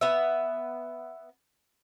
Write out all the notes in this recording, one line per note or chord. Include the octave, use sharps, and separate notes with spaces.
B3 E5